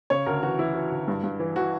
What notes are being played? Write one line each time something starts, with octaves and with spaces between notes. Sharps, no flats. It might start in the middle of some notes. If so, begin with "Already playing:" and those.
C#3 C#5
D2 A#4
E3 F#4
E3 E4
E3
D2
G2
G2
E3
E3 F#4